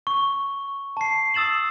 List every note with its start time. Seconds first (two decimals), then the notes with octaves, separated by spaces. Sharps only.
0.07 C#6
0.97 A5 C7
1.34 D#6 E6 A6 E7 F#7